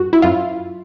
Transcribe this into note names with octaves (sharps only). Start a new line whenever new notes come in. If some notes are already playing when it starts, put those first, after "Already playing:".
Already playing: F#2 F#4
E4
F#2 F4